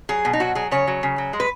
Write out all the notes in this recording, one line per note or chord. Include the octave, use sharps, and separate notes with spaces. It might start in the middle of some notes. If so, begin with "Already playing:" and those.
F#3 G#4
B2
D#4
F#3 F#4
F#3 G#4
C#3 C#5
F#3
C#3
F#3
G#3
B4